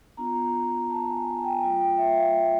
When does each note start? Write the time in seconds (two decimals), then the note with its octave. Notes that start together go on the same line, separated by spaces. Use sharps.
0.17 B3 D4 F4 A#5
0.90 A5
1.08 G#5
1.38 G#5
1.44 G5
1.62 F#3 A3 D4 F4 G5
1.81 G5
1.98 E5
2.17 F5
2.34 G5